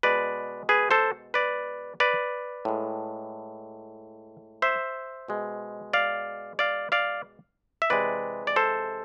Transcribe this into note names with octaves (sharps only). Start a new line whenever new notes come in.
B2 G#3 B4 D5
G#4 B4
A4 C5
B4 D5
B4 D5
A2 G#3
C5 E5
B2 G#3
D5 F5
D5 F5
D5 F5
E5
C3 E3 G#3 B4 D5
D5
A4 C5